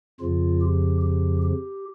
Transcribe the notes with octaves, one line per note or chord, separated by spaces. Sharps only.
F2 C#3 F3 F4
G4
G4
G4